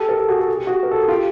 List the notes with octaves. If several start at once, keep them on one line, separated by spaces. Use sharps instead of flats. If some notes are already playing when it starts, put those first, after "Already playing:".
Already playing: G4 A4
A#4
G4 A4
F#4 G#4
A4
G#4
G4
F#4 G#4
A#4
A4
G#4
F4 G4